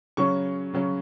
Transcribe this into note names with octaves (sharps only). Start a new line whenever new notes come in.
C#3 F#3 C#4 C#6
C#3 F#3 C#4